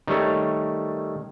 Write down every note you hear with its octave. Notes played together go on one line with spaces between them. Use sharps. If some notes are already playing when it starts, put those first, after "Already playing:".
D#3 G3 A3 C#5